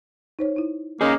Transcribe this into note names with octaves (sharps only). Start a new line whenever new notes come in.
D#4 C5 C#5
D#4 E4
A#3 C#4 D#4 G#4 A#4 C6